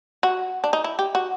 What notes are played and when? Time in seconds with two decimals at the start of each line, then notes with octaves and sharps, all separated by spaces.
0.23 F#4
0.64 D4
0.73 D#4
0.84 E4
0.99 G4
1.15 F#4